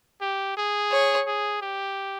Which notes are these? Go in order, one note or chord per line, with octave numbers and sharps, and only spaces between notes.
G4
G#4
C#5
G#4
G4